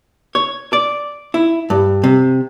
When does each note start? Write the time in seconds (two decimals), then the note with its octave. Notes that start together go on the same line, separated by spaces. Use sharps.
0.35 C#5
0.73 D5
1.34 E4
1.70 G2
2.04 C3